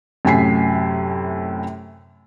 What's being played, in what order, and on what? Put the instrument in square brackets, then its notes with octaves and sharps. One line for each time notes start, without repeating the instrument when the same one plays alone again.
[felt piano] F#2 A2 C3 G#5 B6 C7